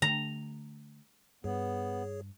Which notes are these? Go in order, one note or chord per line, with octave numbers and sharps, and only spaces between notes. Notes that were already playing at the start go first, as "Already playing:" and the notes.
D3 A3 A#5
G2 B3 G#4 C#5